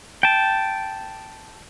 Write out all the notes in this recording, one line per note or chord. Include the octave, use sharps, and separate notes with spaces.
G5 A5